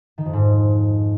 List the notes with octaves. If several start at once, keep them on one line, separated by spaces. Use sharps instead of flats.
D#3
F2
G#2